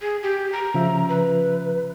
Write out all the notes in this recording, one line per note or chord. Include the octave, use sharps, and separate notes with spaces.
G#4
G4
A#5
C#3 F3 E5
B4